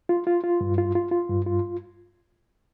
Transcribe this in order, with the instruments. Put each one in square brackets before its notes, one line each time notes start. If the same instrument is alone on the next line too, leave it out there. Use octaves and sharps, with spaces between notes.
[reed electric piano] F4
F4
F4
G2
F4
F4
F4
G2
F4